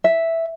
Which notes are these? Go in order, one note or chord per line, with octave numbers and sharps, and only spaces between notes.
E5